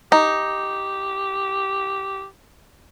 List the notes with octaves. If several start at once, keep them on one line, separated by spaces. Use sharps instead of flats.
D#4 G4